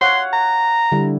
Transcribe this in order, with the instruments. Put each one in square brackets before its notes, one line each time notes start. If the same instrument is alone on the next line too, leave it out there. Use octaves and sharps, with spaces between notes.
[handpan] C#5 F5 F#5 [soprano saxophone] C6
[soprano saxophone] A#5
[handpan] D3 G3 E4